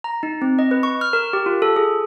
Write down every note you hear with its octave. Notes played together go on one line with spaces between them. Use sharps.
A#5
D#4
C4
D#5
B4
C#6
F6
A#4
G4
F4
A4
G#4